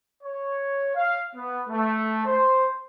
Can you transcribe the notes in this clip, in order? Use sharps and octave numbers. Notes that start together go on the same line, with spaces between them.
C#5
F5
B3
A3
C5